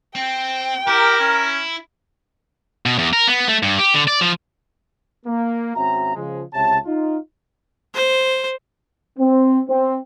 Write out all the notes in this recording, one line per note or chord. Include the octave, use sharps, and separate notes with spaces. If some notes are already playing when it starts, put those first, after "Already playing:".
C4 G5
E4 G4 A#4
C#4
B2
E2
A#4
B3
A3
G2
G4
D3
D5
F3
A#3
G#1 C4 C#4 F#4 E5 A#5
C#3 F3 G#3
C#2 C3 C#5 E5 A5
D#4 F4
C5
C4
C4